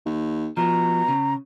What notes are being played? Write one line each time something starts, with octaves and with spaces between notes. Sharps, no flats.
D#2
B2 F3 A#5
C#3